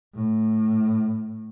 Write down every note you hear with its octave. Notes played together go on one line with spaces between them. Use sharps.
A2